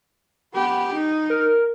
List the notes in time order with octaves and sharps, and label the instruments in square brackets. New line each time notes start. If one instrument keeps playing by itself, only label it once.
[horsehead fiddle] B3 G4
D#4
[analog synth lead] A#4